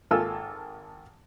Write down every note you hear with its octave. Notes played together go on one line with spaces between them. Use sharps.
G#1 A#3 F4 A4 G#5 E6